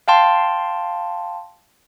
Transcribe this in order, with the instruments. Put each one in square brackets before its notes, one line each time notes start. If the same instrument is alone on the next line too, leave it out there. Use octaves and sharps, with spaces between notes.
[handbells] F5 G5 A5 C6